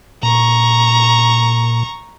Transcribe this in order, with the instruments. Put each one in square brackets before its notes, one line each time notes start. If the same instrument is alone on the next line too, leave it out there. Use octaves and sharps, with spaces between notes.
[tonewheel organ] A#2 [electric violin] A#5 C#6